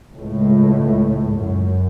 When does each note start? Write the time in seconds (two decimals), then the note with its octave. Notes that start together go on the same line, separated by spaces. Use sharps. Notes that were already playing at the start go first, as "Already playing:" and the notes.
0.13 C#2 A2
1.34 F#2